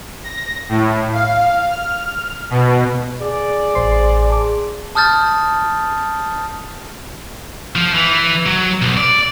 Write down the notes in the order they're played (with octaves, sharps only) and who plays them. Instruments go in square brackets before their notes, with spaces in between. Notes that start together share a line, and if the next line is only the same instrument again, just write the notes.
[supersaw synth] A#6
A2
F5
F6
B2
[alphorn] G#4 [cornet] D5
[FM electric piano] A1 C5 C6
A5 D6
[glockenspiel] A5 D#6 F6 G6 A6
[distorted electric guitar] F3
E3
F#3
B1
D5